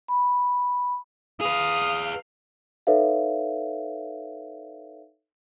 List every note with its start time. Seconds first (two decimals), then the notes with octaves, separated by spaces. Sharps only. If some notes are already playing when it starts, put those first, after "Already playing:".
0.08 B5
1.41 G#4 B4 F5 D#6
2.87 D#4 A4 B4 C#5 E5 F5